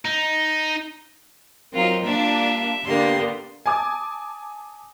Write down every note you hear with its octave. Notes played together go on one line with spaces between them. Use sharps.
D#4
F#3 C4 D#4 F4 A#4
G3 A#3 D4 F4 E5
D3 A#3 B3 G4 C6
G#5 A5 D6 D#6 G#6